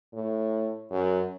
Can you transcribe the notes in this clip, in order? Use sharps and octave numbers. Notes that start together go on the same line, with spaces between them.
A2
F#2